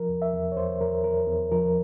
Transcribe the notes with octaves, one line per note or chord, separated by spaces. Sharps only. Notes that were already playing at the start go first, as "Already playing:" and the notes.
Already playing: F3 A#4
E2
E5
E2
C#5
E2 C5
E2 A#4
E2 A#4
E2
F3 A#4